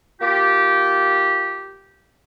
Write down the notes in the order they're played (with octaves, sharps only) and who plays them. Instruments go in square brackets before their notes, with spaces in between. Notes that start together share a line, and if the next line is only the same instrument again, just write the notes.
[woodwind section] A#3 F4 G4